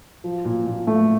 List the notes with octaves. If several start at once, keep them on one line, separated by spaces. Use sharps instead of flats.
F3
A#2
A#2
A3